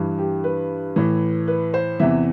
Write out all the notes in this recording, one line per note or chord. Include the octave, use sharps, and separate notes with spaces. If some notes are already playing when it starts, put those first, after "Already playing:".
Already playing: G2 E3
G4
B4
A2 E3
B4
C5
E2 C3 E3 E5